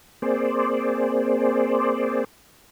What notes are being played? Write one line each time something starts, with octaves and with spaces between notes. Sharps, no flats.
A#3 C4 G#4 C5 D5